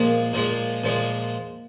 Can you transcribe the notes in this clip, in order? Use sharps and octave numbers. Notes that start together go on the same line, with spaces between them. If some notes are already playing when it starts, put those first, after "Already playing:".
Already playing: A#2 F3 G#3 A#3
A#2 F3 G#3
A#2 F3 G#3